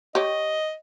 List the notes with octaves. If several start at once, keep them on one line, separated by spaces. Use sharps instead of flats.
G4 C#5 D#5